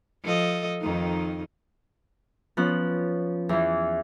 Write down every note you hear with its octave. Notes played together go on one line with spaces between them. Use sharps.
F3 A4 D#5
F2 D#3 D#4
F3 B3 C#4 F#6
E2 E3